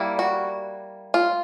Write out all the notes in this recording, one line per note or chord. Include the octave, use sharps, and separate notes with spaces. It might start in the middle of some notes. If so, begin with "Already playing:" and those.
Already playing: G3 A#3 E4
F#4
F4